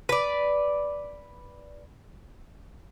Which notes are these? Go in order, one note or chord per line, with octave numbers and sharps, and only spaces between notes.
B4 D5